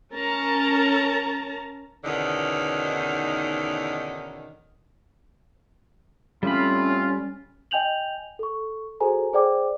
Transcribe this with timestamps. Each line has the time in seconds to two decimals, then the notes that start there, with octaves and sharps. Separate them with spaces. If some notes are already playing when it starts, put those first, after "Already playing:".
0.14 C#4 A#4 A5 A#5
2.05 E2 B2 D3 D#3 C#4 D#4
6.43 A2 G3 C4 C#4 F4 B5
7.71 D#5 G5 G#5 G6 F7 F#7
8.39 A4 C#6
9.00 F#4 G#4 A4 C5 G#5 A#5
9.33 G#4 C5 D5 G5 D6